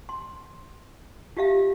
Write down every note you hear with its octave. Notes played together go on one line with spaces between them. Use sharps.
C6
F4 G4 E5 F5